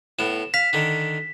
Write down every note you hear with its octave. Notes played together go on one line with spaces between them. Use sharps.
A2 B3 E7
F5 B6
D3 D#3